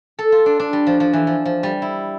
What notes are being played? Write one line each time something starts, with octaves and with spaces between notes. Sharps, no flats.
A4
F4
D4
D4
G3
F3
F3
E3
F3
F3
G3
E4